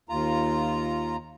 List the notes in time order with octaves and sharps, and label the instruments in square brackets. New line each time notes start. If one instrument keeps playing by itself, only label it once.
[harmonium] D#2 F4 A#5